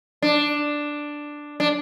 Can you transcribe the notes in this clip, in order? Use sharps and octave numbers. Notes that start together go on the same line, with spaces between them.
D4
D4